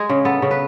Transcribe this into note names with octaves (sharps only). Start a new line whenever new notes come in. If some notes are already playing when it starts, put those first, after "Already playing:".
Already playing: G#3 G#4
C#3
B3 A4
C#3
B4